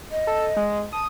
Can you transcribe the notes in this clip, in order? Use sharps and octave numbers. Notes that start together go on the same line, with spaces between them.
D#5
A4
G#3
A5 D#6